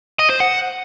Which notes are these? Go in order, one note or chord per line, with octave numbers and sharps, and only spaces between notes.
D#5
C5
F#5